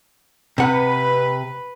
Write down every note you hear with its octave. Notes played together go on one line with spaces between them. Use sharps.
C3 B4 F#5